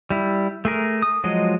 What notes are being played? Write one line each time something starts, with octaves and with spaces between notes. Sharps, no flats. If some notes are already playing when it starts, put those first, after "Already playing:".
G3 E4
A3 G#4 A#4
D#6
F3 F#3 G#3 D#5